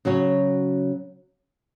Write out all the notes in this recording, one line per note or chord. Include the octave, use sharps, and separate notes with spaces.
C#3 F#3 C#4 F#4 C#5